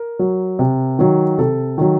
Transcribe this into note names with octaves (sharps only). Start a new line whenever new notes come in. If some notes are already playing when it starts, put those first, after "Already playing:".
Already playing: A#4
F#3
C3
D#3 F#3
C3 A4
D#3 F#3